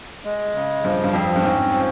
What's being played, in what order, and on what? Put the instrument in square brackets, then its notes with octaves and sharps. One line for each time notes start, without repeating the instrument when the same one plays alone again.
[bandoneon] G#3
C#3
[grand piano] G2 [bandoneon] F3
[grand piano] G2
[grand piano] F2 [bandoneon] C4
[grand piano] G2
[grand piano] G#2 [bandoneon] C#4
[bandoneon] F3